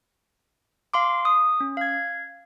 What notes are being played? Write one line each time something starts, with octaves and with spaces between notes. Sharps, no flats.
F5 C6 D6
D#6
C#4
F5 G#6